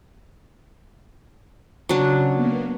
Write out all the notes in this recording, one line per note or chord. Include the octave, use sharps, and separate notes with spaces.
C#3 F#3 D4
A#3 B3